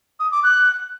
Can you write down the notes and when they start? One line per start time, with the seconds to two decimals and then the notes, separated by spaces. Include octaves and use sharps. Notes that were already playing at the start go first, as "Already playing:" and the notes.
0.20 D#6
0.32 D6
0.43 F#6